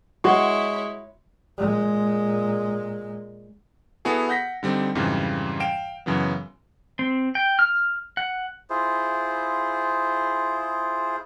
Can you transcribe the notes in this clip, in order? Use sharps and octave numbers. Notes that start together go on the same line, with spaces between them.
G#3 E4 F#4 C#5 C6 C#6
A#2 G#3
B3 E4 F#4 G#4 A4
F#5 G6 A#6 B6
D3 G3 C4 D#4
F2 G#2 C#3 E3 G3
F5 G5 D7 E7
F#2 C#3 E3 F#3 B3
C4
G5
F6
F#5
E4 F4 G#4 C5